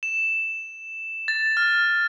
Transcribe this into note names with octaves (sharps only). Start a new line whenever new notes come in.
E7
A6
F6